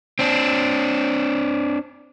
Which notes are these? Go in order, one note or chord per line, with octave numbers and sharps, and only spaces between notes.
C4 D4